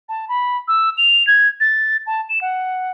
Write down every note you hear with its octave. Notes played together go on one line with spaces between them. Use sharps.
A5
B5
E6
F7
G#6
A6
A5
E7
F#5